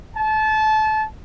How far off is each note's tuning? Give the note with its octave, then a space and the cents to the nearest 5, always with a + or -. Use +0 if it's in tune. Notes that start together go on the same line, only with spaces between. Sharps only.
A5 -25